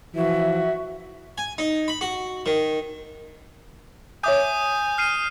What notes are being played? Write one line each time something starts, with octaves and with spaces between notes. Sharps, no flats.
E3 F3 F#4 E5
G#5
D#4
B5
F#4
D#3
C#5 E5 G#5 D6 D#6 G6
F6 C7 D#7